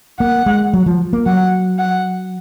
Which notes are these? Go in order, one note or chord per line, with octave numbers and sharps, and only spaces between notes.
A#3 F#5
G#3
F#3
F3
A#3
F#3 F#5
F#5